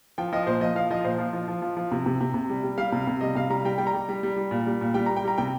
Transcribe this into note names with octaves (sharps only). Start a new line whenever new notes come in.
F3 G5
F3 D#5
A#2 C5
F3 D#5
F3 F5
F3 D#5
A#2 C5
F3
F3
F3
F3
F3
C3
C3
C3
C3
G3
G3
G3 F5
C3
C3
G3 D#5
C3 F5
G3 A#5
G3 G5
G3 G5
A#5
G3
G3
G3
G3
A#2
G3
A#2
G3 G5
G3 A#5
G5
G3 A#5
C3 G5